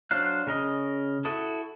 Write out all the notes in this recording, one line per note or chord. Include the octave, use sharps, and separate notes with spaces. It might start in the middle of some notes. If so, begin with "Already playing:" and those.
F#3 D4 C5 F5 F#6
C#3 A#4 D#5
E4 F#4 A4 D#6